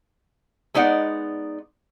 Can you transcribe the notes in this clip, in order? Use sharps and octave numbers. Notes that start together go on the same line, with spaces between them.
G#3 B3 D#4 D5 F#5